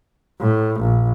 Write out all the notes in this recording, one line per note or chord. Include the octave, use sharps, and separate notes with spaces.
A2
A#1